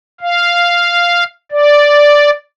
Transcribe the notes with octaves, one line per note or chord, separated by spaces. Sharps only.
F5
D5